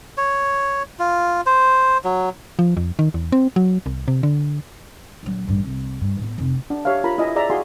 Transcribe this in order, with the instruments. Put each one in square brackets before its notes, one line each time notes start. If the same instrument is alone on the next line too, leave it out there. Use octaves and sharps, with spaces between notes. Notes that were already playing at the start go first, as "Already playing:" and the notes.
[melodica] C#5
F4
C5
F#3
[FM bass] F3
F2
D#3
E2
C4
F#3
C2
C3
D3
[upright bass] A#1 F#3
A1 G2
C2
G2
A2 B3
F1 C3
[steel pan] D4
G4 C#5 E5 F5
D4 F4 A#4 A#5 B5
E4 D#5 E5 G#5
G#4 D5 E5 A#5
E4 F#4 G#4 F5 G#5 C6